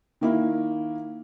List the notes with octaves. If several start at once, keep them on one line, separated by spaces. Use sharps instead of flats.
D#3 A#3 E4